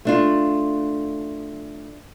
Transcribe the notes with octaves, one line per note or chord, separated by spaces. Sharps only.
A3 D4 F4